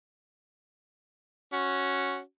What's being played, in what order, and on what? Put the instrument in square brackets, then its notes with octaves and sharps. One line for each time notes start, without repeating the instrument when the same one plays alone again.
[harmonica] C#4 F#4